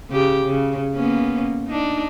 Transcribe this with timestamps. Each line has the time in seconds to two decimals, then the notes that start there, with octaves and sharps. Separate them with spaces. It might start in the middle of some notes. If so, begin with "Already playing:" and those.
0.10 C#3 G4
0.45 C#3
0.94 A#3 B3 C#4
1.68 D4 D#4